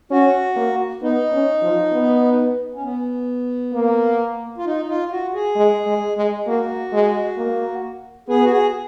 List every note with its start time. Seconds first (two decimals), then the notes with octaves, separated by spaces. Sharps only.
0.11 C#4 F#4
0.56 A#3
1.02 B3 D#4
1.32 C#4
1.63 F3
1.93 B3
2.75 C#4
2.84 B3
3.74 A#3
4.58 F4
4.66 D#4
4.89 F4
5.11 F#4
5.34 G#4
5.56 G#3
5.86 G#3
6.17 G#3
6.47 A#3 F#4
6.93 G#3
7.38 A#3
8.29 B3 G#4
8.44 F#4
8.51 G#4